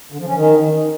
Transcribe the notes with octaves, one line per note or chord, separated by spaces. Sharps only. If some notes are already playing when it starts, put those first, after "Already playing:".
D3
F3
C#4
D#3